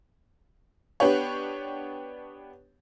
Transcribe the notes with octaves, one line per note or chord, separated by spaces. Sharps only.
B3 D4 G4 B4 C#5